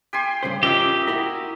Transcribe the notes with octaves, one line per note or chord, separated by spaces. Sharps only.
G4 G#5 C6
G2 C#3 C5
C#4 F4 G4 A#4 D#5 E5 E6
E4 F#4 A#4